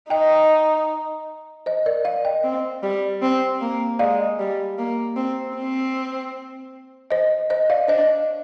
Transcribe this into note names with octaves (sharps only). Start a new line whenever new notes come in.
D#4 D#5 G5
C5 D#5
A#4 D5
D5 F5
D#5 G5
C4
G3
C4
A#3
G#3 D5 F5
G3
A#3
C4
C4
C5 D#5
C5 D#5
D5 F5
D4 C5 D#5